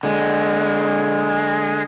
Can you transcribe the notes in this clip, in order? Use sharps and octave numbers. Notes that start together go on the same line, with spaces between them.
D3 G#3